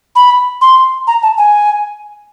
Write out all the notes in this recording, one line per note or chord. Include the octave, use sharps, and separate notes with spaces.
B5
C6
A#5
A5
G#5